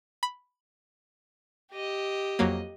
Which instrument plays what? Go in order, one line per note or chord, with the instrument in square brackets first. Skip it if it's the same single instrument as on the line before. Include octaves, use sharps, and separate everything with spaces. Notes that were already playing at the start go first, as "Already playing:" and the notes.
[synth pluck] B5
[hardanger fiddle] G4 D#5
[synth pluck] F2 F#3 A#3